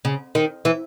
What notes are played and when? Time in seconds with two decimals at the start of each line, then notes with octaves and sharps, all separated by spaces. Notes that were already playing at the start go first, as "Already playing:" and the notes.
0.05 C#3
0.35 D#3
0.65 E3